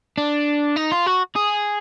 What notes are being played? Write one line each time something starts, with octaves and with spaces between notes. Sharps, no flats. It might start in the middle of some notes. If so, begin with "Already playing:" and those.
D4
D#4
F4
F#4
G#4